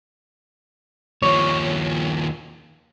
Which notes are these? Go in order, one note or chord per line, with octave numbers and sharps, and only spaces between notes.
D#2 F3 C#5